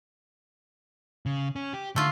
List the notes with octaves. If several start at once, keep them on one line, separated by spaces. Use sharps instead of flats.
C#3
C#4
G4
D3 A3 F4